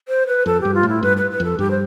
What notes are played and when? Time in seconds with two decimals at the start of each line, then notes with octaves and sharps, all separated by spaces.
0.08 C5
0.27 B4
0.46 F2 A4
0.61 G2 G4
0.74 F4
0.83 A2
0.89 E4
1.03 G2 B4
1.17 B4
1.31 B4
1.40 F2 A4
1.59 G2 G4
1.70 C5